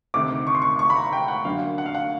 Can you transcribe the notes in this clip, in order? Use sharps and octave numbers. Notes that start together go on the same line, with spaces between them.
D2 C3 D#3 D6
C#6
C6
C#6
C#6
B5
A#5
G5
F#5
F#2 D3 F#3 A#3 F5
F#5
F5
F#5